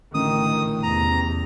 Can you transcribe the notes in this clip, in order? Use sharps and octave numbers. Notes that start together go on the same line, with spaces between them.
A1 D3 D#3 D#6
E2 C3 A#5